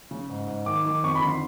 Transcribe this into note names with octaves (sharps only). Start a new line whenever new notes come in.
C#3
G#2
G#2
D#3 D6
D#3 D6
F2 C#6
B5
D3
C6